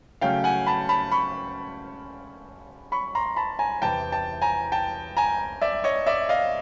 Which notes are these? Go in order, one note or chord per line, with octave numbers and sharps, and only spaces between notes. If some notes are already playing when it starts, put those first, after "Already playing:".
C#3 F#3 A3 C#4 F5 G5
F#5 G#5
A5 B5
A5 B5
B5 C#6
B5 C#6
A#5 C6
A5 B5
G#5 A#5
E2 C3 E3 G5 A5
G5 A5
G#5 A#5
G5 A5
G#5 A#5
D5 E5
C#5 D#5
D5 E5
D#5 F5